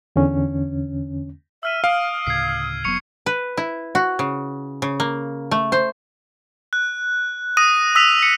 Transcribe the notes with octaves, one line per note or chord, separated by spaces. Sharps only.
E2 D3 C#4
E5 E6 F6 D#7
F5 D#6 D7
D2 A2 C#3 G#6 C7
F1 F#3 B3 C#6 C#7 F7
B4
E4
F#4
C#3
C#3
A#3
A3
C5
F#6
D#6 A#6 D#7
D#6 E6 B6 F7
C#7